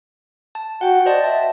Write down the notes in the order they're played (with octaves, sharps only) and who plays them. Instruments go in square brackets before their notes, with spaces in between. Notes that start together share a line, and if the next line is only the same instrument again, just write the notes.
[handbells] A5
[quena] F#4 [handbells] F#5 G5
[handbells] C5 D#5 A5 [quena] D5
[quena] E5 [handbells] A5